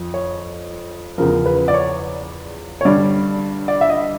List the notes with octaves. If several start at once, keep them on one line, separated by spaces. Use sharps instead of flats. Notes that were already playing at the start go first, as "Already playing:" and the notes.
Already playing: F2 F3
C#5
E2 C#3 F3 A#4
B4
D5
C#5
C#5
G2 D3 G3 D5
D5
E5
D#5